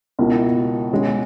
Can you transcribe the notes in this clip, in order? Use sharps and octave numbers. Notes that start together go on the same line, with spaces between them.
C#2 B2 A#3 E4
B2 G#3 C#4